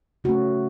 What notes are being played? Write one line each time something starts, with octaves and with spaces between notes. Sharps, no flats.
C#3 A3 C#4 F#4